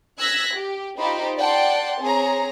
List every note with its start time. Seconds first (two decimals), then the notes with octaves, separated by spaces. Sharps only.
0.20 E6 F#6 G#6 A#6 B6
0.56 G4
0.99 D#4 F4 G4 C5 B5
1.38 D5 F#5 G5 A5 C6
2.01 C4 G#4 C#5 A#5